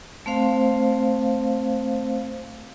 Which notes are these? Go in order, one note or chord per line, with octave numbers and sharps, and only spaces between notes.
A3 C4 C5 F5